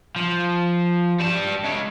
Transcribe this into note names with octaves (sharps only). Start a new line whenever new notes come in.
F3
G3 A5
G#3 C#5